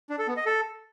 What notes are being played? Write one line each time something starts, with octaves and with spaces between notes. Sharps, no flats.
D4
A4
B3
D#5
A4